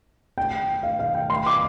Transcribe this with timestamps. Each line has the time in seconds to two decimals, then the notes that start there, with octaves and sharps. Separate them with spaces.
0.38 G5
0.83 F5
0.99 F5
1.15 G5
1.30 C6
1.46 D6